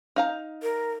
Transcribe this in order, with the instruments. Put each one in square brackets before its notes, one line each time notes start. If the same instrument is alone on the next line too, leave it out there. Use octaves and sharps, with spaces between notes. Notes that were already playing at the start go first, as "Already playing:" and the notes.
[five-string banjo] D#4 F5 A#5
[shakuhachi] A#4